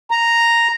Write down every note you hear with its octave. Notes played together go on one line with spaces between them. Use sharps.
A#5